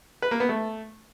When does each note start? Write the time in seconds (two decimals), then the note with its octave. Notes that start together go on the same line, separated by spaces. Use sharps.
0.22 B4
0.31 A#3
0.40 B3
0.49 A3